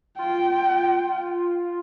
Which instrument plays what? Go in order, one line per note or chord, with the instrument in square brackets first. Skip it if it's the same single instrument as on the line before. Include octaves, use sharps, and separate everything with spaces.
[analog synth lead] F4 [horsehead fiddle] G5